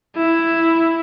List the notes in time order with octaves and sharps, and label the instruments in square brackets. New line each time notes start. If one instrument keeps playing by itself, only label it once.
[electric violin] E4